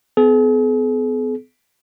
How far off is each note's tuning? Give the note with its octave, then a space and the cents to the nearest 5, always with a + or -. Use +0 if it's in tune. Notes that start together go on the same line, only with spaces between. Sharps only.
B3 +40 G#4 +45